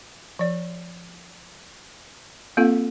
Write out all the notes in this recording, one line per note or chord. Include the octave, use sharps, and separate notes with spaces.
F3 D5
A#3 C4 F4 A4 F5